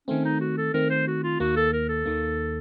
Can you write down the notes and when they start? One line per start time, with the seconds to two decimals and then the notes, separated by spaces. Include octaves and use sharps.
0.08 D#3 A3 C4 C#4
0.25 D#4
0.40 F#4
0.57 A4
0.74 D#3 A3 C4 A#4
0.90 C5
1.08 F#4
1.23 F4
1.40 D#2 D#3 A#3 F#4
1.56 A4
1.73 A#4
1.89 A4
2.06 D#2 D#3 A#3